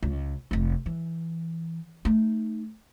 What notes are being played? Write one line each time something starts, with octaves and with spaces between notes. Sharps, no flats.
C#2
F1 F2
E3
A3 D#4